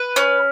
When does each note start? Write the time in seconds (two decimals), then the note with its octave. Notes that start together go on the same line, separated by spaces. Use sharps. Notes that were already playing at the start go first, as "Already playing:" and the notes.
Already playing: B4
0.16 C#4